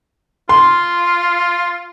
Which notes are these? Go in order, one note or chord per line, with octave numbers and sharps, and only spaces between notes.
F4 C6